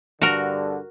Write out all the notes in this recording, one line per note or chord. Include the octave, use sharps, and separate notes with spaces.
G2 D3 F#4 A#4